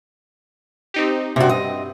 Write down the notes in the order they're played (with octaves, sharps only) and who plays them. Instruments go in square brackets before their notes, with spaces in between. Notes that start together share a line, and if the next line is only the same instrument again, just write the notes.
[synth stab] C4 D#4 G4
[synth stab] G2 C4 [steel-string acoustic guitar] C3 F#4
[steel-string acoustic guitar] D#5